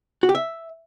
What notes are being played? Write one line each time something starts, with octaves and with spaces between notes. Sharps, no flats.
F#4
G4
E5